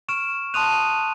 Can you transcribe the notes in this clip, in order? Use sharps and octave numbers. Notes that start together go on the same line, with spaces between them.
C#6 F6 D7 E7
A5 C6 D#6 F#6 D#7 F7